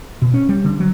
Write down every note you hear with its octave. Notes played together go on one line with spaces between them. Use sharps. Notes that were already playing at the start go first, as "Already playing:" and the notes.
B2
C#4
G3
D3
F#3